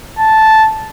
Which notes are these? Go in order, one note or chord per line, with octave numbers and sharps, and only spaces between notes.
A5